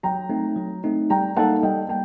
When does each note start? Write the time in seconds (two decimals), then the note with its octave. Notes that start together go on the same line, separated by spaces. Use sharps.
0.03 F#3 G5 A#5
0.29 A3 C4 D#4
0.56 F#3
0.84 A3 C4 D#4
1.10 G3 G5 A#5
1.37 A#3 D#4 A4 F#5 A5
1.63 G3 D#5 G5
1.89 A#3 G5